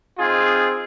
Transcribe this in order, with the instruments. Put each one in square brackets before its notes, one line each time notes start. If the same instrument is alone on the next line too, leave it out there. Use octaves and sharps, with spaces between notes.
[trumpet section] C4 D#4 F4 G#4